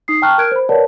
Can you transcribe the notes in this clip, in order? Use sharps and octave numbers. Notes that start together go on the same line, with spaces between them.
D#4 D#6 C7
G5 A5 A#5 C#6 F6 F#6
A#4 F6 F#6 G#6 D7
C5 B5
A#4 B4 C#5 D5 F#5 A5